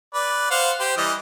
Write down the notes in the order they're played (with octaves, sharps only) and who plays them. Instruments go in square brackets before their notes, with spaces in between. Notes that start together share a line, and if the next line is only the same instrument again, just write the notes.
[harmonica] B4 D5
C5 F5 F#5
G4 C5
E3 G3 D#5